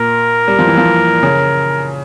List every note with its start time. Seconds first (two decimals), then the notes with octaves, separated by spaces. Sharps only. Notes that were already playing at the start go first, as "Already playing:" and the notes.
Already playing: A#2 A#4
0.48 G3
0.59 F3
0.67 E3
0.78 F3
1.23 C#3